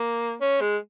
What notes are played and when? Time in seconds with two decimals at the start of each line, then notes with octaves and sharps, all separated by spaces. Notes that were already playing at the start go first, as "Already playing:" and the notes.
Already playing: A#3
0.41 C#4
0.61 G#3